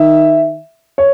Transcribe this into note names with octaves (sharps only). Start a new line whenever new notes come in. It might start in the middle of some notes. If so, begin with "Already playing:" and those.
Already playing: D#3 E5
C#5